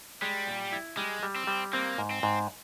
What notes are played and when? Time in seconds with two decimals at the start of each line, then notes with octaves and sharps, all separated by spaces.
0.22 G3 G#3
0.47 A#2
0.72 E4
0.97 G3 G#3
1.23 G3
1.36 C4
1.47 G3
1.73 A#3 C4
1.98 G#2
2.11 C4
2.23 G#2